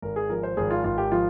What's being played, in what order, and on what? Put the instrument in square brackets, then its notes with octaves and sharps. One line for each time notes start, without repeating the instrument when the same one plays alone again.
[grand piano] G#1 A#4
G#4
F3 A#4
C5
G#1 G#4
F4
G#1 F4
G4
F3 F4